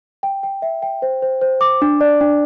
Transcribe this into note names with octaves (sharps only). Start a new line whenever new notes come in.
G5
G5
E5
G5
C5
C5
C5
D6
D4
D5
D4